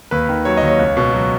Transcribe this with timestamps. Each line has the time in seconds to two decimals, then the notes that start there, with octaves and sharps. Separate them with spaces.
0.11 D#2 B4
0.29 D#3
0.45 F#3 C#5
0.57 D#5
0.63 D#2
0.68 C#5
0.79 C#2
0.97 B2
1.13 F#3